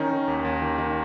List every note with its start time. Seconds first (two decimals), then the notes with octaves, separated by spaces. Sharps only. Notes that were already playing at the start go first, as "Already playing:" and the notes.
Already playing: D#3 C#4 D#4
0.10 D#3
0.28 D#2
0.44 D#2
0.62 D#3
0.78 D#3